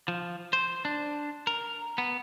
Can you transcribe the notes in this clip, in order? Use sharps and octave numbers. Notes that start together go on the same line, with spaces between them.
F3
C5
D4
A#4
B3